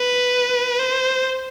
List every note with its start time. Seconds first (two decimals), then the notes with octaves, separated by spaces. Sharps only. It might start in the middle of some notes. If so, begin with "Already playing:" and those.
Already playing: B4
0.79 C5